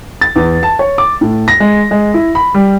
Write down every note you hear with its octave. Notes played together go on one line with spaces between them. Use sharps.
A6
E2
A5
C#5
D6
A2
A#6
G#3
G#3
E4
B5
G3